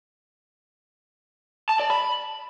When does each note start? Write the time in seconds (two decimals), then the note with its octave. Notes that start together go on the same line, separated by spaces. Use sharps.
1.69 A5
1.80 D5
1.90 B5